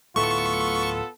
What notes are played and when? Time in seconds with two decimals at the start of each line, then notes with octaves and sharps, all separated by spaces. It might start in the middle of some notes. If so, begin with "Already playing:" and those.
0.16 D1 A2 A3 B3 F4 A4 C#6